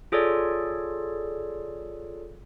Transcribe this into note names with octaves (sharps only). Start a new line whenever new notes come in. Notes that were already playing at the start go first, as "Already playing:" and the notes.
F4 G#4 A4 C#5 D5